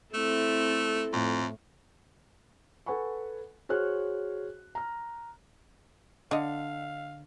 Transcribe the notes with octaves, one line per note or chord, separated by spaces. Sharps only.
A3 C4 E4 A4
F2 A2
A4 B4 F#5 G#5 B5 C#6
F#4 G#4 C5 C#5 F6 F#6
A#5 F6
D3 D4 D#5 F5